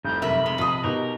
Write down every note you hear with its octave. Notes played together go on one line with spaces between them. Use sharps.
F1 C2 F3 G6
F#2 C3 A#4 E5 B5
C3 G#3
A#1 F4 D#5 D#6
B2 D#4 G4 A#4